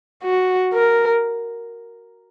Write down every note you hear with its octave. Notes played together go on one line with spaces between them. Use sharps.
F#4
A#4